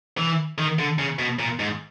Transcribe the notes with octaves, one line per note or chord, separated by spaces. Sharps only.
E3
D#3
D3
C#3
B2
A#2
G#2